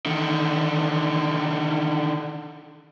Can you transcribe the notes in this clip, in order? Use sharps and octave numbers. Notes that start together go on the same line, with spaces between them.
D3 D#3